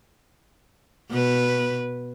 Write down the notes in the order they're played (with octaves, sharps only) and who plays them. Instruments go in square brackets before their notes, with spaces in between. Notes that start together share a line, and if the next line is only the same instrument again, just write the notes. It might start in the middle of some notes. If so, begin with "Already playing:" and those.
[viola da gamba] B2 B4